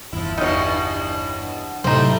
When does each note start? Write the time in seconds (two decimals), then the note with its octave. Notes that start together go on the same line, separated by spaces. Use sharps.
0.13 G1 E2 F3 E4
0.38 G2 B2 E3 D#4 C#5
1.84 A2 C3 F#3 G3 A3 D#4 E4 C5